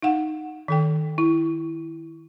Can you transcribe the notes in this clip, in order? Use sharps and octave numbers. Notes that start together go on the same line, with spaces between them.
D#4 F5 F#5
D#3 A4 G5
E4